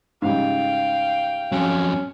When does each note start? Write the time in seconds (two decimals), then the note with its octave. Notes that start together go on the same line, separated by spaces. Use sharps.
0.22 G#2 C#3 G3 F5 G5
1.52 F2 F#3 C#4